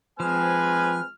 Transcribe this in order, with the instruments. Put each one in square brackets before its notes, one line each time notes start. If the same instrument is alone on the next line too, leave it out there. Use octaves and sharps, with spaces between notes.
[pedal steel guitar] F3 [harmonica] G#3 F6 [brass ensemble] C4 G#5 [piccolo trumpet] B4